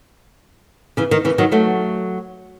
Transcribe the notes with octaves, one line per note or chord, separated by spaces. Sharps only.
C#3 E3
D#3
C#3 E3
D#3 F#3
F#3 A3